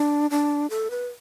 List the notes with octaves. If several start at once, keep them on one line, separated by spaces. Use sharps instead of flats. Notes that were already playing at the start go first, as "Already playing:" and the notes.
Already playing: D4
D4
A4
B4